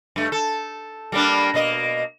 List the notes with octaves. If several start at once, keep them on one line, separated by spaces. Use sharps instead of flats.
G2 A3
A4
G3 A#3 D4
B2 A#3 D#5